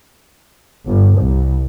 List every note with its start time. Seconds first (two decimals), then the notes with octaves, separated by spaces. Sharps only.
0.84 G1
1.16 C2